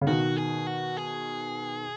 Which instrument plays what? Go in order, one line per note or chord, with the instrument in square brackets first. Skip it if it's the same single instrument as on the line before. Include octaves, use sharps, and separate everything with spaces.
[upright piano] C#3
[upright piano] B2 D#3 [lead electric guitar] F#4
[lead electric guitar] G#4
F#4
G#4